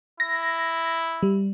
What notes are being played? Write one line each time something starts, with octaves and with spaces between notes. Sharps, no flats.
E4 A#6
G3